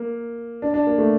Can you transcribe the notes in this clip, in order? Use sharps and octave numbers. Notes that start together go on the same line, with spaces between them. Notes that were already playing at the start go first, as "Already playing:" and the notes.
Already playing: A#3
D4
D4
A#3
A3